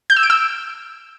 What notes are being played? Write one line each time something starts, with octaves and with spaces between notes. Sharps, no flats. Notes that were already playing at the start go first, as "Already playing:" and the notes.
G6
E6
D7
E6